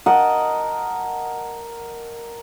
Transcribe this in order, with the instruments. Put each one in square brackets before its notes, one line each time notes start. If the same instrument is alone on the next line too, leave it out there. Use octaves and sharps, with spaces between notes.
[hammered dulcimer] A#4 D#5 F#5 A5